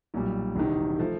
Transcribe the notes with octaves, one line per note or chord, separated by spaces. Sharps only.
B1 A#2 G3
E1 E2 C3 D#3
F3 A3